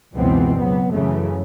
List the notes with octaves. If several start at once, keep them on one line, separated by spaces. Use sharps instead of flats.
F#1 C#2 B2 E3 B3 C4
C#2 F#3 B3
F#2 C#3 E3 A3